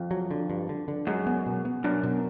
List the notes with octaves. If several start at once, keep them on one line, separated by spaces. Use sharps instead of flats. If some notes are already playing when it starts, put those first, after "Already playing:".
Already playing: F2
F#3
D3
G2
D3
D3
F#2 G#3
B3
B2
B3
F#2 D4
B2